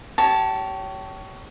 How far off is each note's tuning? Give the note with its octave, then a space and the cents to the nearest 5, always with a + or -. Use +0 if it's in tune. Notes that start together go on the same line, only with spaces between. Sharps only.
G4 -35 C#5 +15 A5 +0